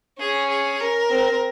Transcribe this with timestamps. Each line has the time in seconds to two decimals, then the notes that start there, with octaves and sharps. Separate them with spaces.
0.19 C#4 G#4
0.50 G#4
0.80 A#4
1.10 C4